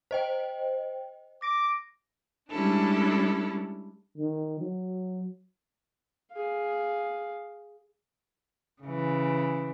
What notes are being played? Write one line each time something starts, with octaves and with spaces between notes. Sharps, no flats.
C5 D#5 G5
D6 A#6
G3 G#3 C#4 D4 E4 A4
D#3
F#3
G#4 F5
C#3 E3